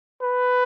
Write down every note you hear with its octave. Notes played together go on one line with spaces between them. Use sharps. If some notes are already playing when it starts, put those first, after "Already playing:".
B4